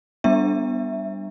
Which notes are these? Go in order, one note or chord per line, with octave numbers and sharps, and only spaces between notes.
G3 B3 D4 E5